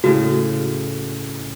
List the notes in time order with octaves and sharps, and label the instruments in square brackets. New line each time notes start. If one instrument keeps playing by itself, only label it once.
[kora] A2 C#3 [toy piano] F#4